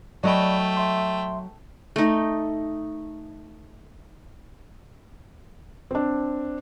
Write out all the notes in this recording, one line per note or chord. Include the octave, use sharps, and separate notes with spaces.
F#3 A3 D5 D#5 G5 B5
E5 C6
A3 D#4
C4 D4